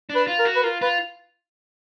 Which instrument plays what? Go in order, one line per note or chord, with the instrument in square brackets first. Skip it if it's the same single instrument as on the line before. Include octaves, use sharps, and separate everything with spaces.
[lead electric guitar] D4
[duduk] B4
[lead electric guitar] F4
[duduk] A#4
[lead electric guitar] F#4
[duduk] B4
[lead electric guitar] F4 [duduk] A#4
[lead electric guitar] F4 [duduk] B4